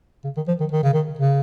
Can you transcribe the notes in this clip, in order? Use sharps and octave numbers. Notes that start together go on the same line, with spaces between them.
C#3
D#3
F3
D#3
D#3
C#3
D#3
C#3